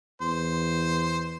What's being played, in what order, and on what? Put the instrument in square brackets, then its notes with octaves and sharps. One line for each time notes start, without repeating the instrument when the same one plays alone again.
[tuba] E2 [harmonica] C5